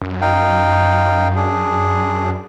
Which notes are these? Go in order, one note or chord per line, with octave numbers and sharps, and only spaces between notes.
F#2
D#4 F5 G5
D4 G#4